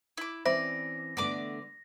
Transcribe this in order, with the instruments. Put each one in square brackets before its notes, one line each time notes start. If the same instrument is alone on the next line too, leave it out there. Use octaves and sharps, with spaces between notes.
[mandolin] E4 D6
[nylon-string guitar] E3 C4 C#4 [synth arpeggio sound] C5 E5 B5 [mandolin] D5 [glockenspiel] A#6
[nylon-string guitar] D3 A3 B3 [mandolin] D5 D6